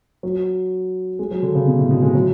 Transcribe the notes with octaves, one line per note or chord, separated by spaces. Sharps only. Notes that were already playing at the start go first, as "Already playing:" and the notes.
F#3
G#3
F#3
D3
C#3
B2
A2
B2
G#3
F#3